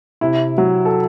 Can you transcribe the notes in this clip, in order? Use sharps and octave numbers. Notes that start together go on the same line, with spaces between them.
C3 E4
F#3
A4